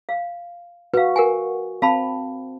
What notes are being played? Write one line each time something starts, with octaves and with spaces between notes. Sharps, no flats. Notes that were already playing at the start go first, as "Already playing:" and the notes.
F5
F#4 B4 F5
A#4 F#5 G#5
C4 F5 A5 B5